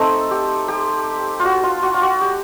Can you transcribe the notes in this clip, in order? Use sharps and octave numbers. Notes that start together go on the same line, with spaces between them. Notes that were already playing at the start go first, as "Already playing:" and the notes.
Already playing: A3 C4 D#4 A4
G4
G4
F4 F#4
F4
F#4
F4
F#4
G4